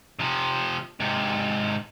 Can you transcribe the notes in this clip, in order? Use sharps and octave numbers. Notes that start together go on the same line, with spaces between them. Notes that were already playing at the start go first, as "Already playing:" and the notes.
C3 F3
G#2 C3